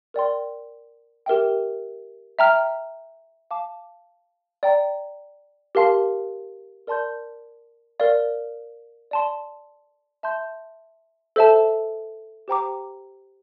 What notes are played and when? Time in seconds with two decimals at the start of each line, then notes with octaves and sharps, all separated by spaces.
0.14 A#4 D5 G5 C6
1.26 G4 A#4 E5 G5
2.39 E5 G5 A#5 F6
3.51 F5 A5 D6
4.63 D5 G5 A#5
5.75 G4 A#4 F5 A5 C6
6.87 A#4 D5 A5 C6 G6
8.00 A#4 D5 F5
9.11 D5 A5 C6
10.23 E5 A5 C6 G6
11.36 A4 C5 E5 A5
12.48 G4 C5 G5 A#5 D6